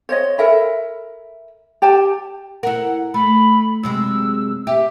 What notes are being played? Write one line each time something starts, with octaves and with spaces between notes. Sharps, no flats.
C5 C#5 D#5
A4 A#4 E5 B5
G4 G5 A5
E4 A#4 F#5
A3 B5
F#2 C3 G#3 E6
G4 E5